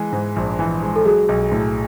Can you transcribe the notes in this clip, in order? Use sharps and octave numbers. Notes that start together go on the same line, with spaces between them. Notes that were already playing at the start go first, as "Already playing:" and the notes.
Already playing: E3 G#3 G#4
G#2
A#1
E3
G#3
A4
F#3 G#4
B1
A2